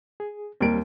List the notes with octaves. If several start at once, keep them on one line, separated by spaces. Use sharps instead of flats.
G#4
D#2 G3 C4 A#4 D7